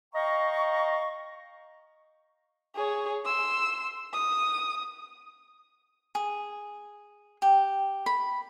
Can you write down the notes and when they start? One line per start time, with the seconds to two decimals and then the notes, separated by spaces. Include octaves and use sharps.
0.14 D#5 F5 G5 A#5 C#6
2.76 G#4 C#5
3.26 C6 E6
4.13 D#6
6.15 G#4
7.42 G4
8.06 B5